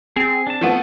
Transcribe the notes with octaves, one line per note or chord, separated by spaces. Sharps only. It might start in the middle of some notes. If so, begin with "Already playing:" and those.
C4 G#4
D4 A5
F3 A3 B3